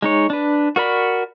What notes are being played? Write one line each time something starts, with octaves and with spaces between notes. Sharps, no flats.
G#3 D#4 C#5
D4 B4
F#4 A#4 D5 B5